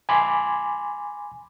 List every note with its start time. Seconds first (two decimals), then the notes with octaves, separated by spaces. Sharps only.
0.09 G#5 B5 C6 D6